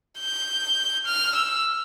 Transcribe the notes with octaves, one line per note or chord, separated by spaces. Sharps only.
G6
F6
E6